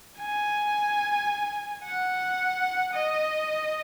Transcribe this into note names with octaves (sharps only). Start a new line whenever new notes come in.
G#5
F#5
D#5